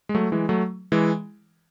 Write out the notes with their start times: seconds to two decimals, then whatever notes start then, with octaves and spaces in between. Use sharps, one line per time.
0.09 G#3
0.14 F#3 A3
0.32 E3 G#3
0.49 F#3 A3
0.92 E3 G#3